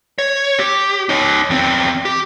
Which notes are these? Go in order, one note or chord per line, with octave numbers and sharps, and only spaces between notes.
C#5
G4
D#4 C#5
E2 C4
G4